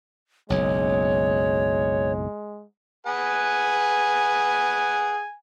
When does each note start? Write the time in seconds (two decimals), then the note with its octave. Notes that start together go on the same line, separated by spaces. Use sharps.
0.50 F#1 B1 G#3 C#5
3.07 G#4 B4 F#5 G#5